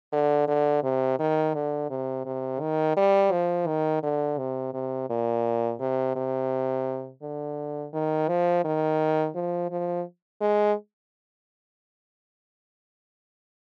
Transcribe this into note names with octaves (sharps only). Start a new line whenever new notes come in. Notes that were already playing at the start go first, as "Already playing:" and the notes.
D3
D3
C3
D#3
D3
C3
C3
D#3
G3
F3
D#3
D3
C3
C3
A#2
C3
C3
D3
D#3
F3
D#3
F3
F3
G#3